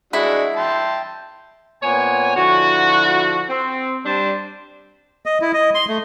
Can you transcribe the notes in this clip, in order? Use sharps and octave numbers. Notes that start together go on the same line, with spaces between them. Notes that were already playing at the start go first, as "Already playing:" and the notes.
G#3 D4 E4 F#4
G5 A5 C6
A#2 B3 C4 C#5 G#5
D3 F3 E4 F#4
C4
G3 D4 C5
D#5
E4
D#5
C6
A3